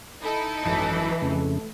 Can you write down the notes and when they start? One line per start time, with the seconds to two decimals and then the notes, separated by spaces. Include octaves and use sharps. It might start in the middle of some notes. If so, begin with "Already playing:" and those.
0.22 D#4 E4 A4
0.64 G#1 F#2 E3
1.22 F2 C#3 A3